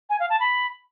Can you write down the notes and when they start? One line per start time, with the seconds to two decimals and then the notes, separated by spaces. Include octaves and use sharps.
0.10 G#5
0.20 F5
0.30 A5
0.40 B5